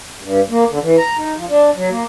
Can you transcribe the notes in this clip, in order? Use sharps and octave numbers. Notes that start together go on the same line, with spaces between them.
G2
A#3
D3
E3
A#5
D#4
F3
D4
F#3
A#3